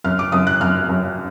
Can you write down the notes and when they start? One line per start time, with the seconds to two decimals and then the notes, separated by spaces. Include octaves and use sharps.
0.04 F#2 F6
0.19 D6
0.32 F#2 D#6
0.47 F#6
0.61 F#2 F6
0.89 F#2